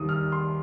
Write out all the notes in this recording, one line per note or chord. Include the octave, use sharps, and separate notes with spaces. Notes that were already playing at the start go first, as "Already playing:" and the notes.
Already playing: D#2 D#3 G3 D#6
F6
C6